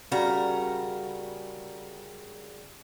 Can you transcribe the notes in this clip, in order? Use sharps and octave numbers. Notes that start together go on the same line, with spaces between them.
C#3 G3 F#4 A#4 A#5